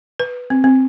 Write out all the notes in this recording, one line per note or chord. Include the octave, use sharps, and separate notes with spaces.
B4
C4
C4